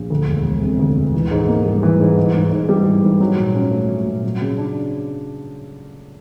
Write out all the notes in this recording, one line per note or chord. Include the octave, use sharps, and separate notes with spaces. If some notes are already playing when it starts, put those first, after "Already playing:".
Already playing: A#1
D2
E1
E1
C3
D2
E1
E3
G#2
A#3
G3
E3
G#2
E3
G#2
G#2
G3
E3
G#2
F#3
A#2
C#4
A3
F#3
A#2
F#3
C#3
D4